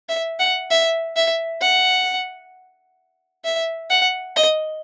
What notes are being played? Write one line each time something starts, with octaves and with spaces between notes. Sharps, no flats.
E5
F#5
E5
E5
F#5
E5
F#5
D#5